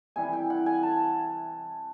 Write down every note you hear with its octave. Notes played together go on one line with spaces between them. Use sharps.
C3 E3 G3 G#5
G5
F#5
G#5
A5